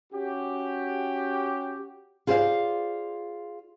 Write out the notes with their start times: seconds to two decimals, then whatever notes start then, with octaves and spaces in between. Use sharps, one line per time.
0.13 C#4 F#4 G4
2.27 F4 G#4 C5 D5 D#5 F5